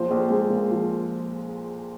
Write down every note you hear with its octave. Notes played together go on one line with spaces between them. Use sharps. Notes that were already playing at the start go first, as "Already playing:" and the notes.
Already playing: A#1 F3 C5
A#1
G#3
A#2
F3